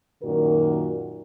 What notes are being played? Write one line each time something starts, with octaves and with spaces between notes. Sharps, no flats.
F#2 A#2 D#3 F#4 A#4